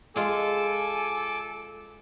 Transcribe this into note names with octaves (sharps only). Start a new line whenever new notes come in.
G#3 F4 G#4 A4 G#5 D6